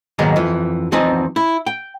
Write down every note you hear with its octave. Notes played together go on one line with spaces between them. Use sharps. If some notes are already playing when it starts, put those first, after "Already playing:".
G#2 B2 D#3 F#3 G#3 A#3
F2 E3
E2 F3 C4 D#4 D#5 G#5
E4
G5